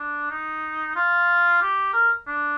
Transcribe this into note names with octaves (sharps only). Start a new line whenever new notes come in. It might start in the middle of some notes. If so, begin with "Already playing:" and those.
Already playing: D4
D#4
F4
G4
A#4
D4